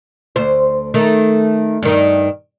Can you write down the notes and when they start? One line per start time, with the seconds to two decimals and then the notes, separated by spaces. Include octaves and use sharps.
0.36 D2 C5
0.94 D#3 A3
1.83 G2 D#3